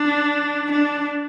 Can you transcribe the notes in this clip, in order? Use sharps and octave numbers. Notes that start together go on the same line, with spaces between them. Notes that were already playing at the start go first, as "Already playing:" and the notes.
Already playing: D4
D4